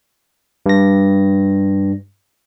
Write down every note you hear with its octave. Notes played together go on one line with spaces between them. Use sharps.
G2 A#6